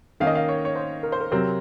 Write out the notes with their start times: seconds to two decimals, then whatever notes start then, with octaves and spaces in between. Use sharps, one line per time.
0.20 D#3 A#3 C#4 F5
0.27 D#5
0.35 F5
0.49 C#5
0.65 C#5
0.76 C5
1.03 A#4
1.12 C5
1.21 A#4
1.31 C3 F#3 C4 A#4